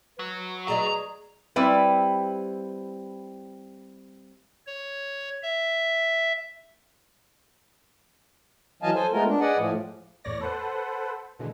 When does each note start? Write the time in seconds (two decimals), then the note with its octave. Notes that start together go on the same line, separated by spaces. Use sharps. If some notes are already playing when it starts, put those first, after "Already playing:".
0.19 F#3 B4
0.68 G#4 D5 D#5 A#5
1.56 G3 C4 E4 G4 B4
4.66 C#5
5.43 E5
8.83 E3 F#3 D#5 F5 G#5 A5
8.95 A4 C5 G#5
9.13 G#3 A3 B3 F4 A#4
9.28 D4
9.41 G#4 B4 D5 D#5 F#5
9.58 A2 F3
10.24 E2 A2 C#5 D5 A#6
10.41 A4 B4 C5 F#5
11.39 B2 D3 E3 G#3